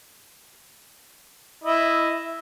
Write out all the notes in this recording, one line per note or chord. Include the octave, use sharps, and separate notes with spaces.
E4 D#5